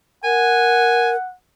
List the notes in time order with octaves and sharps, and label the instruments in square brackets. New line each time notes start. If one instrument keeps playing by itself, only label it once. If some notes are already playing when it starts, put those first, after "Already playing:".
[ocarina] A#4 [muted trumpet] F#5 [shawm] G#5